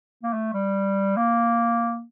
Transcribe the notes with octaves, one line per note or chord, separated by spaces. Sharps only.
A#3
A3
G3
A#3